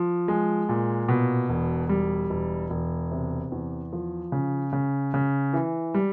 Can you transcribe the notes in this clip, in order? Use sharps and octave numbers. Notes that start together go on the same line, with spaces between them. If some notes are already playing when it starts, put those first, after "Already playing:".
Already playing: F3
G#3
A#2
B2
E1
G3
E1
E1
C3
E2
F3
C#3
C#3
C#3
E3
G3